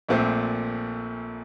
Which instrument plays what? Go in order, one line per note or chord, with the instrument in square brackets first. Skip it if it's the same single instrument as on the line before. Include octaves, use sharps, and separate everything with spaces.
[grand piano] A#1 A#2 A3 C4